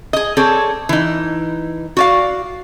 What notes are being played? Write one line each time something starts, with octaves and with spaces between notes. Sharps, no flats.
G#4 D#5
C4 G#4 A4 C#5 D5
E3 D#4
F#4 D5 F5